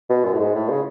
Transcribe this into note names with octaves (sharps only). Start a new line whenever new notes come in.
B2
F#2
A2
G#2
A2
C#3